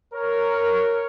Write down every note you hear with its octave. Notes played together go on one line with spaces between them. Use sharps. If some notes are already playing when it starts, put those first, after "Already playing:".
A#4 C#5